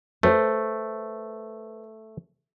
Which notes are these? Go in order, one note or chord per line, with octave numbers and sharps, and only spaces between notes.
A3 B4 C5 G5